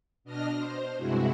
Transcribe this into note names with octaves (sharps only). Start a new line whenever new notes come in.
B2 D4 D#5 F6 A#6
C5
G2 C3 G#3 E4 F#4